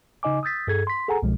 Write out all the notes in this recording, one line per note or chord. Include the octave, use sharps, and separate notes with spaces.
C#3 D#4 D#5 G#5 D6
D#6 E6 G6 A6 B6
G2 G#4 A4 G#6
C6 B6
G#4 A4 F#5 G#5 A#5
C2 B2 F3 G#3